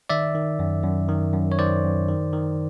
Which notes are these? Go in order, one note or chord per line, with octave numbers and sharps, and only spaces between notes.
D#3 D5 E5
D#3
F#2
F#2
D#3
F#2
C#5
D#3 C5 D5
F#2
D#3
D#3